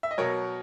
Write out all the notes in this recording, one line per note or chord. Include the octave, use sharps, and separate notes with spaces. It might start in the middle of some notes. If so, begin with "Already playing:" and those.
E5
D#5
B2 F#3 A#4 C#5